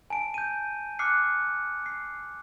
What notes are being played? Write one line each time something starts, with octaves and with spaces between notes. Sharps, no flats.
G#5 A5 D7
G6 D#7
D6 F6 F#6 C7 C#7
C7